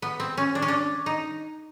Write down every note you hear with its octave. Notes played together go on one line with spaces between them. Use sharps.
B3
C4
C#4
D4
C#4
D4
D#4